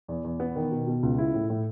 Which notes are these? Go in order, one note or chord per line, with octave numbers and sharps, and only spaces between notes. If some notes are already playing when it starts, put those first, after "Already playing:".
E2
E2
B3
D#3
B2
B2
C#2
E4
A2
A2